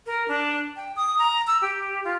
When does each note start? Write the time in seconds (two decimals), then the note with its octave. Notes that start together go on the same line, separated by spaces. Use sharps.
0.06 A#4
0.28 D4
0.76 G5
0.96 D#6
1.19 A#5
1.47 E6
1.61 G4
2.05 F4